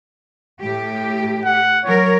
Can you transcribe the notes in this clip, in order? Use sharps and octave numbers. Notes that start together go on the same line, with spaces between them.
A2 G4
F#5
F#3 A#4 C#5